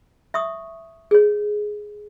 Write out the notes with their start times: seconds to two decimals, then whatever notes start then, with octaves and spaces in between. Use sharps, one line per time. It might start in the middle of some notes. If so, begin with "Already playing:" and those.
0.34 E5 C#6 D#6
1.11 G#4 C#5